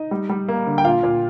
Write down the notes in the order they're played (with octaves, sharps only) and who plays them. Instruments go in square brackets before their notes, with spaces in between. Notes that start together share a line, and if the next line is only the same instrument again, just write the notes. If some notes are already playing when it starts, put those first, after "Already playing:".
Already playing: [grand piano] D#4 D#5
G3
G3
A#3
D3
G5
A#2 F4 F5
A#2